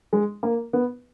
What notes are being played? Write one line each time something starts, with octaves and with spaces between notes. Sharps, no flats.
G#3
A#3
B3